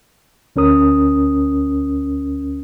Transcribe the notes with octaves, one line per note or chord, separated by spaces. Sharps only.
D2 C#4 A#4 D#6